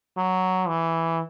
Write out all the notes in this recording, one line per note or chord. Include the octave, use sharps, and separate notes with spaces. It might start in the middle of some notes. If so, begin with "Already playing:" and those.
F#3
E3